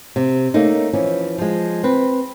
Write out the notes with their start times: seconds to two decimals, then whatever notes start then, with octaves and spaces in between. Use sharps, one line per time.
0.16 C3
0.54 A3 A#3 C#4 D#4
0.93 E3 F3 C#4
1.38 F3 G#3
1.83 C4 B4